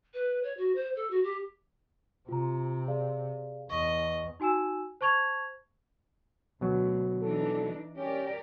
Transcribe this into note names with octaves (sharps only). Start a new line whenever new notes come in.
B4
C#5
F#4
C5
A4
F#4
G4
C3 F4 A#5
G#4 D5 F5
E2 D#5 C#6
D#4 F#4 G#5 E6 E7
C5 A5 C#6 G#6 F7
D2 B2 F#3
E3 D4 D#4 A4
C#4 G4 A#4 D5